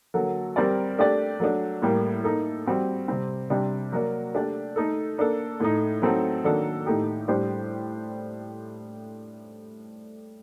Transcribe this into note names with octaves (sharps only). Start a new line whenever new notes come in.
D3 F#3 A#3 F#4 A4
G3 C4 G4 A#4 D5
A3 D4 G4 D5
F#3 A3 D4
A2 G3 A#3
A#3 D#4 A4
G3 C4 F#4
C3 G3 C4
C3 G3 D4 G4
F#3 A#3 F#4 A#4 D5
A3 D4 G4 D5
A3 D#4 A4
A#3 D4 A4
A2 A3 D#4
F#3 A3 C4 D#4 A4
D#3 F#3 A#3 D4 A4
A2 A3 D#4 G4
A2 G3 D4 G4 C5